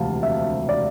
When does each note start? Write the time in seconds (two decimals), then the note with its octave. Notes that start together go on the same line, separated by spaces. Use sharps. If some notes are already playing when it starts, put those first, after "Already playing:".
Already playing: E1 D2 C3 F3 F5 A5
0.23 E5
0.69 D5